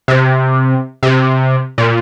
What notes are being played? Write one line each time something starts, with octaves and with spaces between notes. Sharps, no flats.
C3
C3
A#2